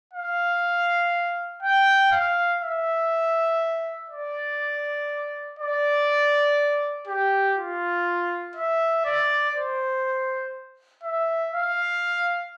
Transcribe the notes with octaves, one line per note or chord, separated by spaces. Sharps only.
F5
G5
F5
E5
D5
D5
G4
F4
E5
D5
C5
E5
F5